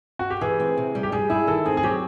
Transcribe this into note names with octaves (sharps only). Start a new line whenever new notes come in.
F#4
G4
E3 G#4
C4
C3
G3
G4
G3 G#4
E4 G#4
D#3 A4
C4 G#4
G#4
F#3 G4